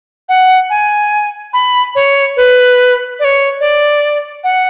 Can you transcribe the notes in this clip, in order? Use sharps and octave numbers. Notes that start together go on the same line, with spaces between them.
F#5
G#5
B5
C#5
B4
D5
C#5
D5
F#5